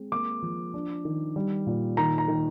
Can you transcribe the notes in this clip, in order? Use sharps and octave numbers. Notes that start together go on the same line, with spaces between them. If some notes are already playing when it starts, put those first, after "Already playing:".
Already playing: G#3 C4
A#3 D6
F3
D4
D#3
G3
A#2
D#3 A#5
A#5
D#3